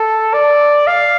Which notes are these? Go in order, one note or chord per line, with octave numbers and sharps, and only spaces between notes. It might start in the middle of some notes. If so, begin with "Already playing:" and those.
Already playing: A4
D5
F5